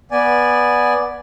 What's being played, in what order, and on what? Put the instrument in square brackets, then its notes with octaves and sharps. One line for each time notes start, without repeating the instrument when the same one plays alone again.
[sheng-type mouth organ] B3 D5 G#5